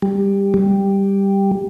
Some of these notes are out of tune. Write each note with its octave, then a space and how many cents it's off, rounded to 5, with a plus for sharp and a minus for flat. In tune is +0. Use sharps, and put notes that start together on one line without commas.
G3 +15
G3 +5